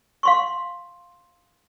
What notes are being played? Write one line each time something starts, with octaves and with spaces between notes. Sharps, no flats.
F5 C6 C#6